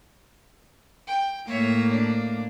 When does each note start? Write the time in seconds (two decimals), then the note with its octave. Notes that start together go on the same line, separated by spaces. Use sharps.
1.07 G5
1.47 A2 A#3 C#5 E5
1.92 D4